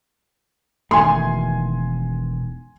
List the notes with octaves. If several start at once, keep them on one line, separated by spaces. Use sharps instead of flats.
E1 D#3 A3 G#5 C6